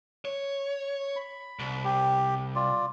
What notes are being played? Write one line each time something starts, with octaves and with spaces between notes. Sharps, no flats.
C#5
B5
C2
G4
F4 D5